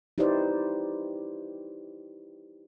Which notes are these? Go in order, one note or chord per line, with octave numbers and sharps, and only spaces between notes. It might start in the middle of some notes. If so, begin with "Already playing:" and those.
D#4 E4 G4 B4 C5 D5